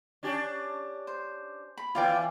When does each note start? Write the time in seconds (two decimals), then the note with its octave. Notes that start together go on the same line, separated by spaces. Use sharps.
0.23 C#4 D4 G4
1.07 C5
1.78 B5
1.95 E2 E3 F4 D5 G5